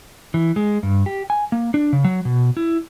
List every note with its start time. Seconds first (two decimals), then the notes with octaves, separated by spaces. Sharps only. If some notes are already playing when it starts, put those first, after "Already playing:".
0.34 E3
0.56 G#3
0.83 G2
1.06 G4
1.30 G#5
1.52 A#3
1.74 D4
1.93 C#3
2.04 F#3
2.25 B2
2.57 E4